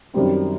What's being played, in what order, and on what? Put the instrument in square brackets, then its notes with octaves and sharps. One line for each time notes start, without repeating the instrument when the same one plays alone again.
[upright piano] F#2 D#3 G3 C4 G4